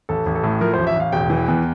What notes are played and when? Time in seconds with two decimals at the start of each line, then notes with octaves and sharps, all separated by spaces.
0.09 A1 A4
0.26 A1
0.35 A4
0.43 A2
0.61 F3 A#4
0.74 C5
0.78 A1
0.87 E5
0.95 A1 F5
1.12 E1 G5
1.30 E3
1.48 E2